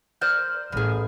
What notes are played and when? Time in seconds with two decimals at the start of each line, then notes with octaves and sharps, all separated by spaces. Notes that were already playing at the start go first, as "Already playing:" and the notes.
0.21 A#4 C5 D5 F6 G6
0.72 A1 G3 G#4